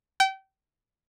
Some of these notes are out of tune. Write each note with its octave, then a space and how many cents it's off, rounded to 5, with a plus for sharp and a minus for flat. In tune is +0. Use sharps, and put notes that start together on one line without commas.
G5 -30